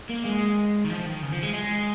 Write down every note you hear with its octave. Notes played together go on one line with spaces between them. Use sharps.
A#3
G#3
D#3
F3
D#3
C#3
F3
G#3
G#3